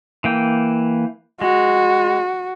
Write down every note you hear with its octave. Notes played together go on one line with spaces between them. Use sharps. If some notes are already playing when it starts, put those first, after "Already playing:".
E3 A#3 G5
G#3 F#4